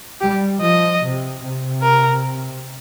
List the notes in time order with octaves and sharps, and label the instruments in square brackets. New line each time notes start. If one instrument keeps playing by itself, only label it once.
[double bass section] G3 [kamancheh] G4
[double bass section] F3 [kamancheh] D#5
[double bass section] C3
C3
[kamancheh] A#4